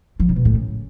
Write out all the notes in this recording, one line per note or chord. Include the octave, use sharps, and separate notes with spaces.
F3
C#3
B2
A2
C#3